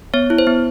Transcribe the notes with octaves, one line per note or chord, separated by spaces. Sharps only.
B3 C#5
E4
C5
B3